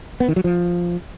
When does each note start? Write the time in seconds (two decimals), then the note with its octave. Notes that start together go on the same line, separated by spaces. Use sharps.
0.20 B3
0.28 D#3
0.36 F#3
0.44 F3